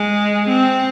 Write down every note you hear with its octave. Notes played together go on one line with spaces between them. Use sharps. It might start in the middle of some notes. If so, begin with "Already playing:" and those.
Already playing: G#3
C4